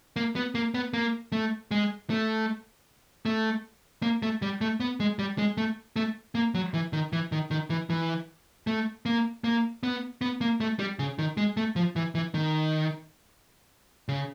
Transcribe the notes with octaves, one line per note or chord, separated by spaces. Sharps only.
A#3
B3
A#3
B3
A#3
A3
G#3
A3
A3
A#3
A3
G3
A3
B3
G#3
G3
G#3
A3
A3
A#3
F#3
E3
D#3
E3
D#3
D#3
E3
E3
A3
A#3
A#3
B3
B3
A#3
A3
G3
C#3
D#3
G#3
A3
F3
E3
E3
D#3
C#3